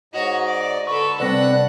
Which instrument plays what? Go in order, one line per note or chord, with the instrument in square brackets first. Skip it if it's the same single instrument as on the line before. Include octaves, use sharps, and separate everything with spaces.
[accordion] G#2 D#5 [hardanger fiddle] F#4 C#5
[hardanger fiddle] D5
[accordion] D3 [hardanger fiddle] A4 B4 [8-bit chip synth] C#6
[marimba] C3 G3 A#6 [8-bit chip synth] C4 D5 [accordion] D4 B4 [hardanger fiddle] F#5